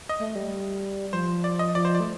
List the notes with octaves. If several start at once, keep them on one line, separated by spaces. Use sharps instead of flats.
D#5
A3
G3
F3 C5
D5
D#5
F3 D5
C5
D5
A3